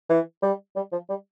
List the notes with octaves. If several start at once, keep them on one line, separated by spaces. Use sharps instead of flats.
E3
G3
G3
F3
G3